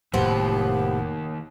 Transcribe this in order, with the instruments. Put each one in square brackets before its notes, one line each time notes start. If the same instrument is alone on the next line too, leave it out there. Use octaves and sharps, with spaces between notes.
[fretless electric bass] F1 A2 F#3 [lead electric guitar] D#2 [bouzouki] F3 B3 C4 [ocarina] G4